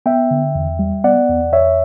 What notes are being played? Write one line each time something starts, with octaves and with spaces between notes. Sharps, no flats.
B3 E5 G5
D3
E2
G3
B3 D5 F#5
E2
E2 C#5 E5